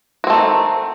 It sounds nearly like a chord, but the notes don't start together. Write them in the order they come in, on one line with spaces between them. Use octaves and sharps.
F#4 C4 A3 D#3